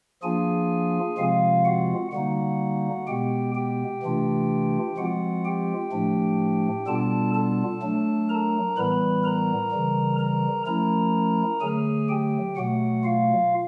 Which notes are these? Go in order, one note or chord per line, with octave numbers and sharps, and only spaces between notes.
F3 A#3 D4 F4 G#4 G#5
C3 F3 G#3 C4 F4 F5
F#4 F#5
D3 G3 A#3 D#4 F#4 F#5
B2 G#3 B3 G4 G5
G4 G5
C3 E3 A3 D4 F4
F3 G#3 C4 F4 F#4 F#5
G4 G5
A2 F3 A3 D4
B2 G3 B3 D4 F4 A4 A5
A4 A5
F#3 A3 D4
A#4 A#5
A2 E3 G3 B3 B4 B5
A#4 A#5
C#3 E3 G3
A#4 A#5
F3 A3 C#4 E4 A#4 A#5
D3 F#3 A3 G#4 G#5
G4 G5
B2 F#3 A3 F#4 F#5
F4 F5